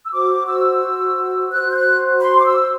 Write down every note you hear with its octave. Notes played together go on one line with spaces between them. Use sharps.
E6
F#4 C5 D6
E6
F#4 C5 F#6
G6
F#6
B5
C6
D6
E6